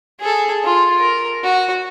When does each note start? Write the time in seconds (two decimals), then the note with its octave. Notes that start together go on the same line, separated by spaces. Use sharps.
0.20 G#4 A4
0.64 F4
1.00 A#4
1.43 F#4